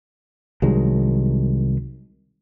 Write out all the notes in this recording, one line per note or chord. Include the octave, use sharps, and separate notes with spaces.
C2 D#3 F#3 G#3